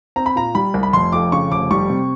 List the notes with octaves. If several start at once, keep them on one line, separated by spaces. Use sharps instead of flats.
C4 A#5
B5
A#2 A#5
G3 B5
C2
B5
F1 C6
F2 D6
C#3 C#6
F1 D6
G3 C#6
C3